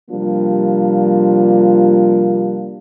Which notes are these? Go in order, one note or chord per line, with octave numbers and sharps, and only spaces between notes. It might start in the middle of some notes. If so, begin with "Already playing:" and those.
C3 F3 G3 A#3 D4 F4